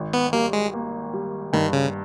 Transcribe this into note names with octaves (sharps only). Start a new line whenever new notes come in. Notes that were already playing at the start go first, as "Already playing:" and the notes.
Already playing: G#1
B3
G3 A#3
G#3
A#3
G3
G2 D#3
C#3